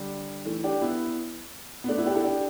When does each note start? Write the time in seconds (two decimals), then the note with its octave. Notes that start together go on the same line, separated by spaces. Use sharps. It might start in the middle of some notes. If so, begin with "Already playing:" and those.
Already playing: D3 G3
0.45 E3 A3
0.64 D4 G4
0.82 B3 E4
1.84 B3
1.88 A3 D4
1.98 B3 E4
2.06 D4 G4
2.15 E4 A4
2.24 D4 G4